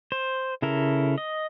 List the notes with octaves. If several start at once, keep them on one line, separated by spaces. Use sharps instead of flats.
C5
C#3 E4 A4 A#4
D#5